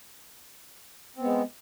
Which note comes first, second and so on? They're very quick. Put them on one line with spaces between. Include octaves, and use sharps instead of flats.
C4 B3 G#3